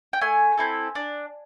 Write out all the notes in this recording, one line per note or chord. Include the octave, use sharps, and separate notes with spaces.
G5
A3 G#5
C4 E4 A4
D4